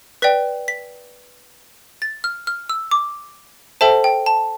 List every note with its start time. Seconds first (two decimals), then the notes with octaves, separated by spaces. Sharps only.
0.22 B4 D5 G5 B6
0.68 B6
2.02 A6
2.24 F6
2.47 F6
2.69 E6
2.91 D6
3.81 A4 C5 E5 G5 A5
4.04 G5
4.26 A5